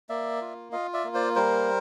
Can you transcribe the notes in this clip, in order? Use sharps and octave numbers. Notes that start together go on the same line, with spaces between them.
A#3 D5 E5
F4
F4 D#5 F5
D5 E5
A#3
C5 D5
G3 A#4 C5